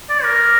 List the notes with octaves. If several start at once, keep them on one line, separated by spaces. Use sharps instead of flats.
D5
A#4